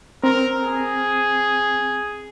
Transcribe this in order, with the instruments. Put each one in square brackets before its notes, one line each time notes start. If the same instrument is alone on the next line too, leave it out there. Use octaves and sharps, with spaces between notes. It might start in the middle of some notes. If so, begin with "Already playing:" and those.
[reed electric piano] C4 [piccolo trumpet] A#4
[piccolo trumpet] G#4